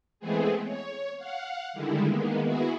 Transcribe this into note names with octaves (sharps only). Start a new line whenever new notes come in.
E3 G#3 A3 B3 C4 G#4
C#5
F5 F#5
D3 D#3 G3 G#3 E4
D#3 G#3 A#3 B3
B3 E4 F#4 G#4